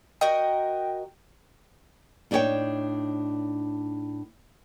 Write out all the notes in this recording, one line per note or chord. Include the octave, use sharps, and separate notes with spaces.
F#4 A#4 D#5 G5
A2 D4 D#4 F#4 C#5 G5